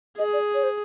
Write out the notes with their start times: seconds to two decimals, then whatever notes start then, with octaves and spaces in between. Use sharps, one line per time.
0.18 G#4 D#5
0.33 D5
0.54 C#5
0.63 C5